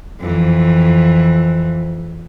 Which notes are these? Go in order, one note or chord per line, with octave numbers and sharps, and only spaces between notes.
F2 E3